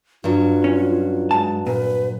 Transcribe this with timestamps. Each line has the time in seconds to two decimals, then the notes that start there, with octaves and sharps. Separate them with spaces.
0.24 G2 F#3 F4
0.64 C#4
1.31 G#2 A5
1.67 A#2 B4